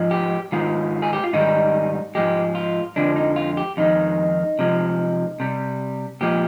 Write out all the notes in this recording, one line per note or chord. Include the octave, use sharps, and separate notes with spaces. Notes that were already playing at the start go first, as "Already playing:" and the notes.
Already playing: G#2 F3 G#3
G4
G#2 D#3 G#3 F4
G#4
G4
F4
G#2 D#3 G3 D#4
G#2 F3 G#3 G4
F4
F2 D3 F3 G#3 D4
D#4
F4
G4
F2 D#3 G#3 D#4
C3 F3 G#3
C3 G3
A#2 F3 G#3 G4